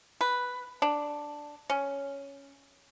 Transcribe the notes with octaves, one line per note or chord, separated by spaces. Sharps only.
B4
D4
C#4